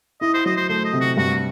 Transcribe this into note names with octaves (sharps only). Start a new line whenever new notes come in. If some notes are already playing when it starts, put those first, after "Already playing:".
E4 D#5
C5
F#3 D#5
C5
A3 C5
D#5
C3
F#4
G2 F#4